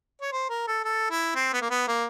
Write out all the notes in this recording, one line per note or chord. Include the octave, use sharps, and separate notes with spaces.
C#5
C5
A#4
A4
A4
E4
C4
B3
A#3
B3
A#3